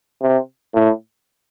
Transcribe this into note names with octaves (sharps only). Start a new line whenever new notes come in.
C3
A2